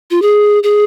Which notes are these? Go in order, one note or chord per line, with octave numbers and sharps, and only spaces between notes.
F4
G#4
G#4